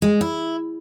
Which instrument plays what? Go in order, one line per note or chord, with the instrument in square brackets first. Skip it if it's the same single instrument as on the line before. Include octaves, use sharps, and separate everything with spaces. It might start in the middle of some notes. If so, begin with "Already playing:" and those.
[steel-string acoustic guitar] G#3
E4